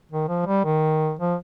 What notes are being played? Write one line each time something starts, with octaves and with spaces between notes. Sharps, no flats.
D#3
F3
G3
D#3
F3